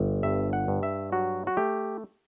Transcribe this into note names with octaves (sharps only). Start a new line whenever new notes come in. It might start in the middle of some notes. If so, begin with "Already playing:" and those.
Already playing: G1
G2 E5
F#5
G2
E5
F#3 F#4
F#4
A3 G4